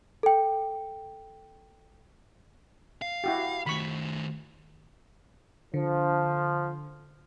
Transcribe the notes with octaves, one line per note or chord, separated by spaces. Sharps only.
A4 G5
F5
E4 F#4 G4
D#3 A3 B5 C#6
D3 F3